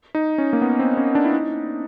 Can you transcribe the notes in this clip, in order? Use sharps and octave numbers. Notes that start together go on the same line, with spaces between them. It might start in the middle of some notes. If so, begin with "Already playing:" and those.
D#4
C#4
A#3
B3
C4
C#4
D4
E4
D#4